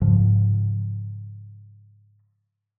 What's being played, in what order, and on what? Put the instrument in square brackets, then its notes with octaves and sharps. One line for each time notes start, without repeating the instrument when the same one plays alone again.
[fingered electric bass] G#2 C#3 F3